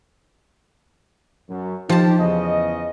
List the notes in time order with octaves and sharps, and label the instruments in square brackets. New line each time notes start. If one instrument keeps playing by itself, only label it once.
[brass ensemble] F#2
[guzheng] F3 A5 [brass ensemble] D#4 F4 G4
[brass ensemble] E2 C#3 D#5